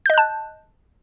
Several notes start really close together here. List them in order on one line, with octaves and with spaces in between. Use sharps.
G6 D#5 F#6 A5